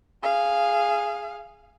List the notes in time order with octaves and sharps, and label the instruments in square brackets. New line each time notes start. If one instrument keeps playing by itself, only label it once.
[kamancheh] G#4 F5